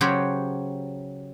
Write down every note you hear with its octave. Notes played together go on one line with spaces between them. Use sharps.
C#3 F#3 G4 C5 C#5 F#5